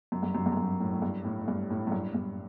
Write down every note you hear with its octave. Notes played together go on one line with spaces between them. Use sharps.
F#2
G2
F#2
G2
F#2
G2
A2
A2
G2
A2
A2
G2
A2
F#2
G2
G2